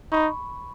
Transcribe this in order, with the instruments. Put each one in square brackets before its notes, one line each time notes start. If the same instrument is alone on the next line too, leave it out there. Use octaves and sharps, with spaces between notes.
[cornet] D#4 [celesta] B5 C#6